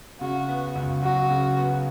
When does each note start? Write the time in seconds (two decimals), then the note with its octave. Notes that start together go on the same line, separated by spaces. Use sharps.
0.21 C#3 F#4
0.49 B3
0.76 C#2
1.02 F#3 F#4
1.30 C#3
1.58 B3